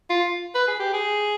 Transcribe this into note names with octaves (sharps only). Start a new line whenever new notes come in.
F4
B4
G#4
G4
G#4